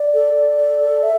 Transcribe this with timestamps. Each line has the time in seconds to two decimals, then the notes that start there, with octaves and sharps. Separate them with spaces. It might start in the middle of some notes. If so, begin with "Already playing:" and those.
Already playing: D5
0.14 A4
0.34 A4
1.03 E5